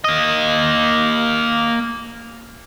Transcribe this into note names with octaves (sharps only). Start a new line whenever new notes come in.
A#3 D#5